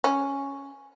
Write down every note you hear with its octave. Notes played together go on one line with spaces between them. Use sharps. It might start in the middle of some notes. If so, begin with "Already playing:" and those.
C#4